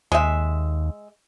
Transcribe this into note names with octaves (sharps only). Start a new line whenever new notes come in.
D#2 G#3 E5